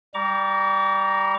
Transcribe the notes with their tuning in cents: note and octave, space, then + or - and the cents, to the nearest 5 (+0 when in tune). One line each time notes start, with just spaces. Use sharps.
G3 +0 A#5 +0 D6 -45